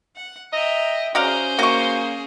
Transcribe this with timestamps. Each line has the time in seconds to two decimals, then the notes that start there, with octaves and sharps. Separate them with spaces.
0.16 F#5
0.53 D#5 E5 G5 A#5
1.15 C#4 F#4 G#4 C5 D5 F5 A#5
1.59 A#3 F#4 C#6